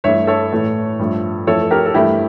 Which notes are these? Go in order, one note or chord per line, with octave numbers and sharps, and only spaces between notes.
G2 E3 A3 C#5 E5
A4 C#5
A2 E3 A3
G2 F3 A3
F2 E3 A3 A4 C#5
G4 A#4
A4
G2 E3 A3 E4 G4